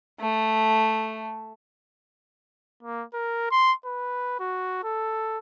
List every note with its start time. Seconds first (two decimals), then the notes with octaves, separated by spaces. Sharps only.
0.20 A3
2.83 A#3
3.14 A#4
3.51 C6
3.85 B4
4.40 F#4
4.84 A4